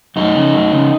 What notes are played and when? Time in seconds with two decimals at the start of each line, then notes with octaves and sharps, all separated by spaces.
0.16 F#2 D#4
0.35 C#3
0.54 F#2
0.72 C#3